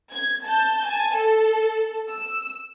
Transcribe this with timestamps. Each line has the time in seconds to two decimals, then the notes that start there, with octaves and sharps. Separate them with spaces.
0.12 G#6
0.46 A5 G6
0.83 G#5 A5
1.16 A4
2.10 E6